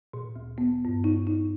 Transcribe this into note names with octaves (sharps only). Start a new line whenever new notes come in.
A#2
D2
B3
G2
D#4
D#4